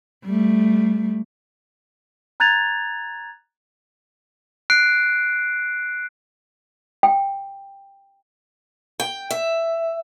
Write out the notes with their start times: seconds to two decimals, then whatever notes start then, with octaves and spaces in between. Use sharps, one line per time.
0.24 G3 A3
2.40 A#5 F#6 G#6 A6 F7
4.70 F#6 C7 D7
7.03 G5
9.00 G5
9.30 E5